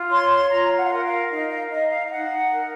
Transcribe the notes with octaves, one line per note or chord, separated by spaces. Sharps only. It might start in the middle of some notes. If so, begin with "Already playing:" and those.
Already playing: F4
C#5 C6
C6
F4 A#5
F#5
F5
A#4 F#5
F5
D#4 D#5
F5
D#4 D#5
F5
F5
D#4 F#5
A#4